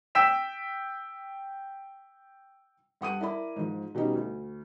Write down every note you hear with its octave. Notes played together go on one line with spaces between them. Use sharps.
G5 E6 B6 E7
G2 F#5 D#6 D#7
E4 A#4 D5 B5
G#2 F3
B2 G3 C#4 D#4
D2